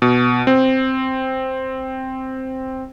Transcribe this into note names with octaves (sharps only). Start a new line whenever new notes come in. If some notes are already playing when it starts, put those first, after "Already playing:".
B2
C4